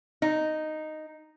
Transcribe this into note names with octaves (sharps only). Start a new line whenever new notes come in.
D#4